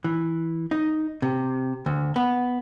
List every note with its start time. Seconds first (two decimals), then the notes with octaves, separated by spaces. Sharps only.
0.04 E3
0.71 D#4
1.22 C3
1.86 D2
2.16 B3